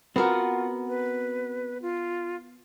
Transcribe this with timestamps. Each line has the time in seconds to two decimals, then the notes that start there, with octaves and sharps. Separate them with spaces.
0.16 B3 C4 F4 F#4 A#4
0.88 B4
1.82 F4